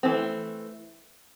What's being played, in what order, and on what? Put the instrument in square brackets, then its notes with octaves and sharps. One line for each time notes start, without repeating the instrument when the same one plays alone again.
[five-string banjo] E3 A3 C4